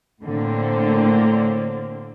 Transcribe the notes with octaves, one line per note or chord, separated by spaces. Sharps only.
A2 D3 A#3 C4